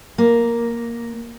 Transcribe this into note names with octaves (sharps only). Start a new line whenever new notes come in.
A#3